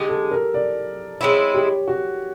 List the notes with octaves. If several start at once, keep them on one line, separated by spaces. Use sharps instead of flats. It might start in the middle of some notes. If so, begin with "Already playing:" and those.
Already playing: D3 G#3 G4
A4
A#4
D5
G#3 C4 E4 C#5
G4
F#4